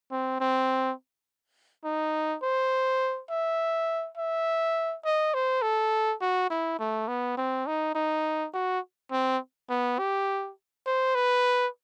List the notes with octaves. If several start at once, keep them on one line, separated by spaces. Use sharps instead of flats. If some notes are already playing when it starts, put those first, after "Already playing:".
C4
C4
D#4
C5
E5
E5
D#5
C5
A4
F#4
E4
A3
B3
C4
D#4
D#4
F#4
C4
B3
G4
C5
B4